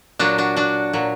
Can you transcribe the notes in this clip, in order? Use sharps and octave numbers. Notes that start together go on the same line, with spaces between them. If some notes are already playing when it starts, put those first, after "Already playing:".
A#2 F#3 D4 F#4
D4 F#4
D4 F#4
A#2 F#3